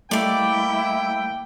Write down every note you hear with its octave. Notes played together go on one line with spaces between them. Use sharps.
G3 A3 A#3 E4 D5 D#5 G5 D6